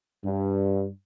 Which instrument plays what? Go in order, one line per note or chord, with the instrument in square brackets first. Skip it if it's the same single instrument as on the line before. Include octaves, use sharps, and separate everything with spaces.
[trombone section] G2